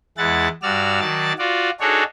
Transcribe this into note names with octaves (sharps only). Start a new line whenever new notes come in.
E2 G#3 E4 F#5 A6
G2 F#4 D5 E6 F6
D#3 F#3 D5 A5 A6
F4 F#4 D5
D4 D#4 F#4 G#4 A4 C#5